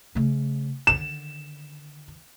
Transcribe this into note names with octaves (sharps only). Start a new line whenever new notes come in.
C#3 A3
D3 D#3 E7